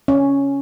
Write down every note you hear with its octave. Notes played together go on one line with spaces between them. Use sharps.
C#4